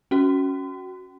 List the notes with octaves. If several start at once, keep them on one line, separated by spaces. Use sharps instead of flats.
C#4 F#4